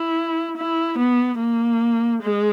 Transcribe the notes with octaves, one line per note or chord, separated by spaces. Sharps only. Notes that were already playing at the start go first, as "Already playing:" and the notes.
Already playing: E4
E4
B3
A#3
G#3